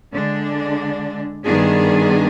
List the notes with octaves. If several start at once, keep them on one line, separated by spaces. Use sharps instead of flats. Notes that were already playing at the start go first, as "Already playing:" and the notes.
D3 G#3 D4
G2 D#3 B3 D4 G#4